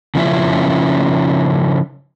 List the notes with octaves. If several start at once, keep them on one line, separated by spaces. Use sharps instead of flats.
C#3 F3 C#4 E4